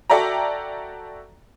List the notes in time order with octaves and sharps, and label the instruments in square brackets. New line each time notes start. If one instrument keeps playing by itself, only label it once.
[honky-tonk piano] F#4 A4 D5 E5 G5 A#5